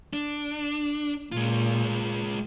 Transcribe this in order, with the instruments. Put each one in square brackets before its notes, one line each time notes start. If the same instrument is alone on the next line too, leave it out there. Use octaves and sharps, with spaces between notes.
[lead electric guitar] D4
[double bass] A#2 [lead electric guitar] G#3 F4